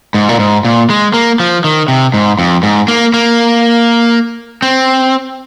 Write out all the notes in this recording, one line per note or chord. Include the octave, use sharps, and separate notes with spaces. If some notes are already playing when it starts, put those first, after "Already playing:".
G#2
A#2
G#2
A#2
G#3
A#3
F3
D#3
C3
G#2
F2
G#2
A#3
A#3
C4